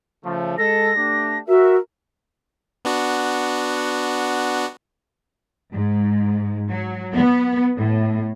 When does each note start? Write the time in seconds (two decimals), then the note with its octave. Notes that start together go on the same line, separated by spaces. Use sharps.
0.25 C#3 F3 A3
0.58 G#3 A4 A#6
0.96 A3 D4 G4
1.49 F#4 A#4 E5
2.85 B3 D4 F#4
5.73 G#2
6.70 F#3
7.13 B3
7.77 A2